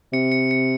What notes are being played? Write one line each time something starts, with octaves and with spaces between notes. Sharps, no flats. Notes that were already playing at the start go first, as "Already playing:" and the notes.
C3 C#7
C#7
C#7